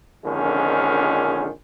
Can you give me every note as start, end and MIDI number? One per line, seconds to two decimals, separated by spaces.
0.24 1.49 34
0.24 1.49 41
0.24 1.49 50
0.24 1.49 51
0.24 1.49 56
0.24 1.49 61